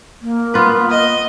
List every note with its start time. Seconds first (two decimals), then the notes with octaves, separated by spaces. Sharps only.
0.22 A#3
0.54 B3 F4 B4
0.90 D#5